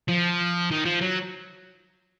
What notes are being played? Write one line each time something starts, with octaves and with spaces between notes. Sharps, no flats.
F3
D#3
F3
F#3